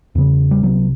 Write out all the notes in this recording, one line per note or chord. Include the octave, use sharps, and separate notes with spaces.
E2 C#3
G3
C2 C3 F#3